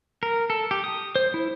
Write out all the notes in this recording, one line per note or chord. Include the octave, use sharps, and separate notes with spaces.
A#4
A4
G4
D#6
C5
E4